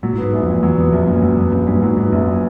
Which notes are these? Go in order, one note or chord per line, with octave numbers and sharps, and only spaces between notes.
A#2 F#3
A2
G#2 B3
A#1
F2 A#2
E2 F#3
E2 B3
A#1 F2
F#2 A#2
F#2 F#3
F2 B3
A#1 F#2
G2 A#2
G#2 F#3
G#2 B3
A#1 F#2
A#2